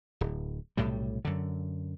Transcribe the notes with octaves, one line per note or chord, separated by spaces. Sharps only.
D1
B1 A2 C3 G3
F#2 D3